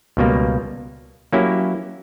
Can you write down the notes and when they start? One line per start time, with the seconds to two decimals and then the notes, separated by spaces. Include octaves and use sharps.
0.17 C#2 B2 G3 A#3
1.33 F#3 A#3 C#4 E4 G4